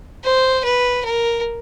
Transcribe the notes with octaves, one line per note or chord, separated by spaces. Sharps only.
C5
B4
A#4